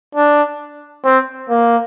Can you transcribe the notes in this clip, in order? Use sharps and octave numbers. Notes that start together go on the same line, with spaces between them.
D4
C4
A#3